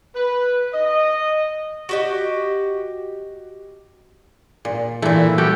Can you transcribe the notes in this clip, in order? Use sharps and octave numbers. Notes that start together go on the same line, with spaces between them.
B4
D#5
F#4 G4 D#5
A#2
A#2 E3 A3
G3 F#4 G4 A4